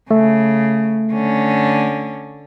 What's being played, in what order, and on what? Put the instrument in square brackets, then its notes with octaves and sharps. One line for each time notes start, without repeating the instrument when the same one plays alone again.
[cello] C#3 [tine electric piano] A3
[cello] D3 C#4